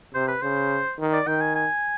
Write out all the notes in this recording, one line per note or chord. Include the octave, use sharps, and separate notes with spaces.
C3 C5
B4
C#3 C5
D#3
D5
D#3 G5
G#5
G#5